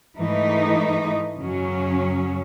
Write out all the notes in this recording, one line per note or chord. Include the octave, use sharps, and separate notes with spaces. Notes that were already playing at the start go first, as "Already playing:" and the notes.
G#2 E3 A3 D#4
F#2 C#3 F#3 C#4